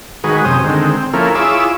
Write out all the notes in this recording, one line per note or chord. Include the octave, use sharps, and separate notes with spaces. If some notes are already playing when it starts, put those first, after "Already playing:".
D#3 G#3 F#4 G#4 B4
F#2 C3 C#4 C5 D#6
D3 D#3 G#3 C4
C4
F3 A#3 C#4 E4 A4 A#4
E4 F4 G#4 C#5 D6 E6